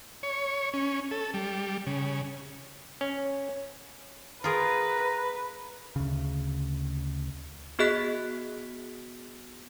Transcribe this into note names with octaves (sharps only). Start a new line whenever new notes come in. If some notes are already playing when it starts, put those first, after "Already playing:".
C#5
C#4
A4
G3
C#3
C#4
F4 G#4 A#4 B4 A#5
D2 C#3
B3 F#4 G#4 D#5 F#6 B6